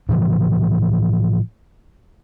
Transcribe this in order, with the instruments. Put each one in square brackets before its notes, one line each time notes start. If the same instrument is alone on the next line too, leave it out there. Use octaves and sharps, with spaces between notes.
[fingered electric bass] A2 C#3 E3 F3